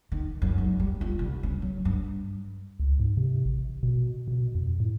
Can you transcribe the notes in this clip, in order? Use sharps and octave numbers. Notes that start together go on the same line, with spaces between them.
D#3
F#2
G#1
G3
F4
C2
C#4
F#3
G2
C#2
G#2
C3
A1
B2
B2
F2
A2